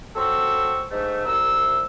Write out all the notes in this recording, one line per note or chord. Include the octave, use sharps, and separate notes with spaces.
F#3 C4 A4 C#6 E6
G#2 A3
C2 C3 A#4 E6